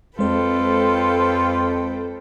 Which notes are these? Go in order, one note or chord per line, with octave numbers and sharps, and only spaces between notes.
F2 G#3 F4 A4 B4 C5 G5